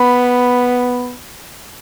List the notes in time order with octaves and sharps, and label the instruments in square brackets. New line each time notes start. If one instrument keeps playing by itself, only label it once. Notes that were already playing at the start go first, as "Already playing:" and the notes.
Already playing: [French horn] B3 [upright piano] B5